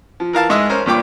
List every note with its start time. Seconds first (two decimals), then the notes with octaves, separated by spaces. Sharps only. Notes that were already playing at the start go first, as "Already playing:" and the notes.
0.20 F3
0.33 E3 A#4 F5 A5
0.49 G#2 G#3 D#5 E5
0.70 C#4 A#4 C5
0.86 G2 A#2 G5 D6